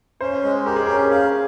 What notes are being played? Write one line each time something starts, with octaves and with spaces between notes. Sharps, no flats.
C#4 C5
G#3
G4 A#4
G#4
C#4 A#4
A#4
G#4 F5